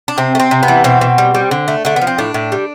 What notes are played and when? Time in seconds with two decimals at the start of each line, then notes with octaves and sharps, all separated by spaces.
0.08 D4
0.18 C3 C4
0.35 A3
0.40 C4
0.51 C3
0.63 B3
0.68 E3
0.84 B2 C4
1.01 B2
1.18 G3
1.34 G3
1.51 D3
1.68 A3
1.85 D3 A3
1.96 B3
2.01 F3
2.07 C4
2.18 A2 D4
2.34 A2
2.52 G3